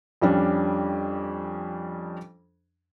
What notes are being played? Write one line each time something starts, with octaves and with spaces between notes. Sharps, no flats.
F2 G3 C#4 D4